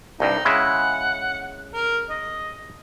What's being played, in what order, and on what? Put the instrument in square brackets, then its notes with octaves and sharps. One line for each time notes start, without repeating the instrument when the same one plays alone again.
[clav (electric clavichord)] C2 G2 [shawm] D#4
[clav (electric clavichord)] C#3 G#3 E4 [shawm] F#5
[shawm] A#4
D#5